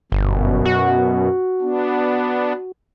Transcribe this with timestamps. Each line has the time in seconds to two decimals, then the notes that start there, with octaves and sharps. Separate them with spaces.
0.12 G1 F#2 B2
0.65 F#4
1.62 B3 D4